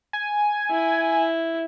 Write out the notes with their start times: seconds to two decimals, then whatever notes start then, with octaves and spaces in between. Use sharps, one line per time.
0.13 G#5
0.71 E4